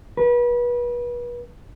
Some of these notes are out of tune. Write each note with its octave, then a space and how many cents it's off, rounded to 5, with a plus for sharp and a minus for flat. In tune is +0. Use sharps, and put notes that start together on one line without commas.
B4 -35